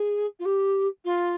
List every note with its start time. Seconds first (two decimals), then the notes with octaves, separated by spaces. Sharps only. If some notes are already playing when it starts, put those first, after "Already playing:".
Already playing: G#4
0.39 F4
0.45 G4
1.04 F4